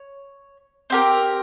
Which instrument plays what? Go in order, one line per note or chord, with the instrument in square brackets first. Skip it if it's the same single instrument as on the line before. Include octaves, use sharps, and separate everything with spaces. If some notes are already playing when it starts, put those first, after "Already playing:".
Already playing: [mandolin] C#5
C4 G4 A#4